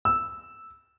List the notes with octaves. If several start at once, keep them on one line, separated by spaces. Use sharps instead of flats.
E6